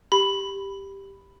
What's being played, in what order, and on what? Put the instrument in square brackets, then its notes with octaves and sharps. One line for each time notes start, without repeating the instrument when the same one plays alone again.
[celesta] G4 [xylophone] B5